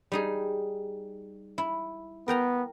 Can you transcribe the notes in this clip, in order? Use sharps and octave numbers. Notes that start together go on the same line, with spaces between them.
G3 D#4 G#4
E4
B3 A#4 G5 A#5